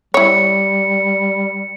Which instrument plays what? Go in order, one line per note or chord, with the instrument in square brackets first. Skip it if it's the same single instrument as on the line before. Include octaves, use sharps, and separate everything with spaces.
[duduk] G3 [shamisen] E4 C#5 [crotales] C#7